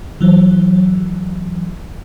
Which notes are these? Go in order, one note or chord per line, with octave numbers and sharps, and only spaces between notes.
E3 F#3